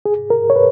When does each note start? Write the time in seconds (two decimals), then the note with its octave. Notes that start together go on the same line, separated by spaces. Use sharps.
0.06 G#4
0.30 A#4
0.50 C#5
0.56 B4